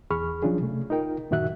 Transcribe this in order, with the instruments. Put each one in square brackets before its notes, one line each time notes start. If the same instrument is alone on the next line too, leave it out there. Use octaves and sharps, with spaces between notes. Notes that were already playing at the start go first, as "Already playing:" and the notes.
[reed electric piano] E2 G#4 B5 C#6 F6
F3 F#3 C#4 D4 F4 G#4
C3 A3
D#4 F4 A#4 G5
F#2 A#2 D#3 F#4 E5 F#6